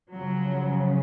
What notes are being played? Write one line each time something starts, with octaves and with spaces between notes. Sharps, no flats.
F#2 C#3 F3 F#3